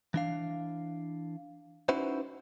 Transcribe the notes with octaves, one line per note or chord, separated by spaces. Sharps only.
E3 D4 F5
C#4 D#4 E4 F#4 B4 C5